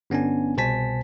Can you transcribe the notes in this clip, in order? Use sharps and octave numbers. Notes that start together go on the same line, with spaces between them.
G1 B3 C#4 D4 G#5
C2 B2 C5 G#5 A5 B6